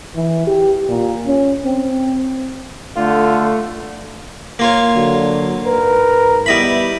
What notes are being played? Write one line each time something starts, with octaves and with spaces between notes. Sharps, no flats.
E3
G4
A#2
C#4
C4
D3 A3 F4
A#3 F4 C#5
D3 F#3 F#4
G#2 A#4 B4
G3 B3 E4 D#5 B5